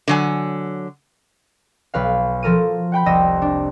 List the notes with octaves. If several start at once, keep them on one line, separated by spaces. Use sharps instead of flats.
D3 F#3 G#5
B1 B4 F5
F3 A4 A#4 F6 D#7
F#5 G5 B5 G6
F1 C2 D#5 E6 A#6
D4